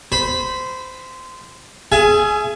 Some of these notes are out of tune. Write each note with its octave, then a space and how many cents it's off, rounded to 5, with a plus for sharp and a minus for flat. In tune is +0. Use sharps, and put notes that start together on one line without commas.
C5 -20 B5 +0
G#4 +20 E5 +40 G#5 +0